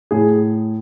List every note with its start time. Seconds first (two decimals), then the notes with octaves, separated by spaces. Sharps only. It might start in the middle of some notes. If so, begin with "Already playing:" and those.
0.11 A2 G#4